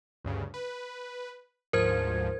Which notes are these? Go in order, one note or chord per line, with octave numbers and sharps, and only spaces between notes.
D2 G2 C#3
B4
D2 G#2 F3 A#4 C5 G#6